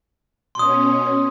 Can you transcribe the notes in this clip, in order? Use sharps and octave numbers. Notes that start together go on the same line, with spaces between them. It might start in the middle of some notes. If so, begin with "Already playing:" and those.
B2 C#4 C6 D#6